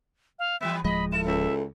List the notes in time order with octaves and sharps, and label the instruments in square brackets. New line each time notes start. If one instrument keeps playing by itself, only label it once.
[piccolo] F5
[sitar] E3 G3 B3 [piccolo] E5
[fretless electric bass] D1 F3 G#3 [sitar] D#5 [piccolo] B5
[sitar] E4 A4 [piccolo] E7
[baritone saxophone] C#2 [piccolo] E5